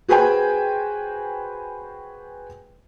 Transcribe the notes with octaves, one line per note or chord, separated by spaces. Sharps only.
F#4 G#4 B4 C5 G5 G#5